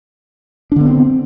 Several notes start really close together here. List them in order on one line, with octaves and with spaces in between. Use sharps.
D4 D3 B3 C4